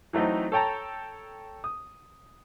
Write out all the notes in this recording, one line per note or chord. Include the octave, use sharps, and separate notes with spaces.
E3 F#3 A3 C4 D#4
A4 C#5 G5 A5 A#5
D#6